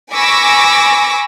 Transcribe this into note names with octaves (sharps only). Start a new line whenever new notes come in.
G#5 B5 C#6 D6 E6 A#6